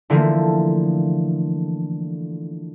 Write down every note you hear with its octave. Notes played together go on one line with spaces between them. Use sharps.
D3 E3 F3 A3 A#3